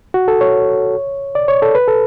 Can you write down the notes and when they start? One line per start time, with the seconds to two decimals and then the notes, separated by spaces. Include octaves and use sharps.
0.14 F#4
0.28 A4
0.41 C#5
1.35 D5
1.48 C#5
1.62 A4
1.75 B4
1.88 A4